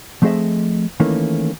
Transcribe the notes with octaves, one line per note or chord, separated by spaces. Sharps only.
F3 A3 C4 G#4 D#5 E5
D#3 E3 A3 A#3 C#4